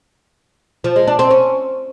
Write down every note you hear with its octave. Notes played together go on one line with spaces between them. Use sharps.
F3
G#3
D4
C4
C#4